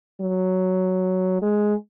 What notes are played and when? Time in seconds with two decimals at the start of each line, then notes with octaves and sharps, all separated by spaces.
0.21 F#3
1.42 G#3